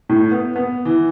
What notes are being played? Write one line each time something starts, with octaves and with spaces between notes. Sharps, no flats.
A2
B3
B3
E3